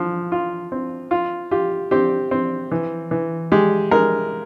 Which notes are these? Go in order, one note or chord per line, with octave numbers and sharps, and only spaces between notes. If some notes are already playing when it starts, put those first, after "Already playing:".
Already playing: F3
F4
C4
F4
F4 G4
C4 G4
C4
E3
E3
G#3 G4
G#3 A#4